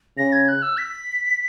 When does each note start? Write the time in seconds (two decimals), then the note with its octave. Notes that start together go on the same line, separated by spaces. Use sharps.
0.18 C#3 A#6
0.33 G#6
0.48 F#6
0.62 E6
0.78 B6